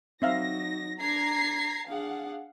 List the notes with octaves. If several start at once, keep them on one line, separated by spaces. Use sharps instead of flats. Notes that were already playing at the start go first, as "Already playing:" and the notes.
F#3 C4 D#4 E5 F5 A#6
D4 A#5 G#6 C7
D4 G#4 F5 F#5